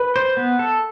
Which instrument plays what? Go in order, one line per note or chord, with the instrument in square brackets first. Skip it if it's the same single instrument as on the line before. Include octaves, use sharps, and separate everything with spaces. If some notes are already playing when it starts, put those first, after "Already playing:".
Already playing: [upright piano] B4
[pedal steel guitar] C5
B3
A4